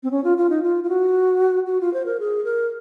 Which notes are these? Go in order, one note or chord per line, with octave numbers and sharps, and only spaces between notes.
C4
C#4
F4
F4
D#4
F4
F4
F#4
F#4
F4
C5
A#4
G#4
A#4